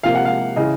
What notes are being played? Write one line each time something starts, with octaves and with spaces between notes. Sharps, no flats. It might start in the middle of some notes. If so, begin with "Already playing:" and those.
C3 F3 A#3 F5
F#5
F5
C#3 E3 D#5